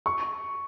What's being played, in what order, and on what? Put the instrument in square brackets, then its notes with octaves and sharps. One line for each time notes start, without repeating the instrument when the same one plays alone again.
[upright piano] C#6